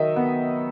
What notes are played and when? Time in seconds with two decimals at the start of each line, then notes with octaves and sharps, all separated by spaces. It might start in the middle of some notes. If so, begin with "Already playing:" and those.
Already playing: D#3 F#3 D#5 E5
0.16 B3